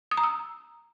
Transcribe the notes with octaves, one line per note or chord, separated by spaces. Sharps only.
D#6
A#5
E6